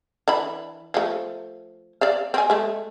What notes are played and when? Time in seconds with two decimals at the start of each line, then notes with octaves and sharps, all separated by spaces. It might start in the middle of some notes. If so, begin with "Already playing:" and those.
0.28 E3 D4 B5
0.94 F3 A3
2.01 D5 E5 F5
2.34 C4 G#5
2.50 G#3 A3